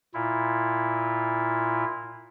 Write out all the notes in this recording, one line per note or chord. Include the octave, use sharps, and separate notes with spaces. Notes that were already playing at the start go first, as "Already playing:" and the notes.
A#2 E4 F4